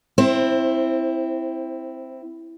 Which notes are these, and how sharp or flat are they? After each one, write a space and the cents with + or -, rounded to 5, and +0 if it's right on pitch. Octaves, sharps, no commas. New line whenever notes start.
C4 +0 E4 +0 C5 +25